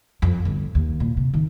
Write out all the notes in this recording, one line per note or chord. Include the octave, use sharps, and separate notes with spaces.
F2
G1
D#2
A#2
C3
D#3